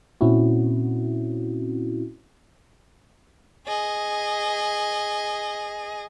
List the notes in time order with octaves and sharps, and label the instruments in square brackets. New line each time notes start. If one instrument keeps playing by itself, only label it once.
[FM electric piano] A#2 C4 C#4 E4 F#4
[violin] G#4 D#5